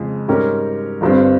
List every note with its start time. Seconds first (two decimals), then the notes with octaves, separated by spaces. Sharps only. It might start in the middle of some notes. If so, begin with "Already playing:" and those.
Already playing: F2 C#3 G#3 C#4
0.28 G#2 G3 C#4 G4 A#4
1.01 G1 G2 G3 C4